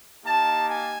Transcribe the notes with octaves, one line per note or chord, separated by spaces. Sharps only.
A#3 D#4 G4 A5
G#5